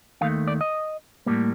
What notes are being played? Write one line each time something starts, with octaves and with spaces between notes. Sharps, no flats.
D#2 D#3 A3 F5
D5
D#5
A2 G3 A#3